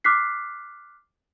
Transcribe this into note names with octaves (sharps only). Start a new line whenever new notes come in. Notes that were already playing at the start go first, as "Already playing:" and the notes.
D6 F6 F#6 B6 C7